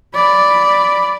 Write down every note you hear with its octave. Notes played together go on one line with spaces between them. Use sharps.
D5 B5